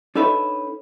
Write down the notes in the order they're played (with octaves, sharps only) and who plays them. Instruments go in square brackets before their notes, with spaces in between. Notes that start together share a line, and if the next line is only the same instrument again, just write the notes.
[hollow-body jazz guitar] D4 D#4 A4 B4 C#5 E5